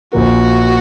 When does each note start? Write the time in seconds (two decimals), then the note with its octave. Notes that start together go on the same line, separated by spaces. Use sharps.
0.13 A#1 A#2 F3 A#3 F#4